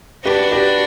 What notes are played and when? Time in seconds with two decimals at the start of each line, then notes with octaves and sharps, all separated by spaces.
0.24 D4 F#4 G4 B4
0.52 G4 B4